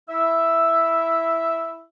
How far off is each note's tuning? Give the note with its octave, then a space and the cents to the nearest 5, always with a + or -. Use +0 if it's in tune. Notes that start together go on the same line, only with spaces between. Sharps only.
E4 +0 E5 +0